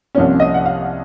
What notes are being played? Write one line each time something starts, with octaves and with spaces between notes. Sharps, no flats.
C2 C3 F3 A#3 C#4 C#5
D#5
F#5
F5